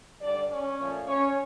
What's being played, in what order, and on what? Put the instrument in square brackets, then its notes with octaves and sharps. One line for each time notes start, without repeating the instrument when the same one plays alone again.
[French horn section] G2 D3 G3 D4 D5
C#4 C#5
A#2 F3 A3
C#4 C#5